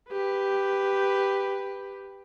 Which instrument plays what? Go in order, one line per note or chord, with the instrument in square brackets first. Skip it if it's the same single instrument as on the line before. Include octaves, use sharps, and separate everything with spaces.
[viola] G4 B4